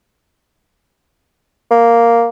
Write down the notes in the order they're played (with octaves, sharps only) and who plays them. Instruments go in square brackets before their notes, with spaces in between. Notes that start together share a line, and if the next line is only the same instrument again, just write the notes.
[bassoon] A#3